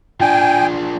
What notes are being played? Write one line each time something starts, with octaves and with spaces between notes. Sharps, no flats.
F3 D4 G5 G#5